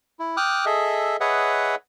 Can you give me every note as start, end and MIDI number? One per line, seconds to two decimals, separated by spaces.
0.19 0.36 64
0.37 0.65 79
0.37 0.65 86
0.37 0.65 87
0.37 0.65 89
0.37 0.65 90
0.66 1.17 68
0.66 1.17 69
0.66 1.17 75
0.66 1.17 76
1.20 1.75 68
1.20 1.75 71
1.20 1.75 73
1.20 1.75 75
1.20 1.75 76
1.20 1.75 78